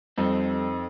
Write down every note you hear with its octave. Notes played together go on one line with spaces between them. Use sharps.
F2 G3 C4 D#4 A4